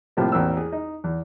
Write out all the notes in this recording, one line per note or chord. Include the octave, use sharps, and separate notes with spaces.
A2 C3 F3 G3 A#3
A1 E2 A#3 C4 E6
G#4
D#4
E2